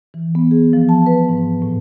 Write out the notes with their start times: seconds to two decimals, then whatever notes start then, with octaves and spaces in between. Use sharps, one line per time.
0.14 E3
0.35 B3
0.51 G#4
0.73 F3
0.89 A5
1.06 B4
1.29 G#2
1.62 A2